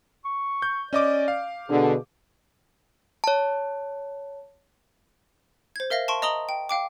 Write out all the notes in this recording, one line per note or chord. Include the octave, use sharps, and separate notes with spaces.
C#6
G6
C#4 D5 D#5 D6
F5
B2 D3 G#4
C#5 A5
C5 G#6
A#4 E5 F5 A#6
A5 C6 C#6 D7
D#5 A#5 D#6 F#7 G7
G5
F5 G5 D6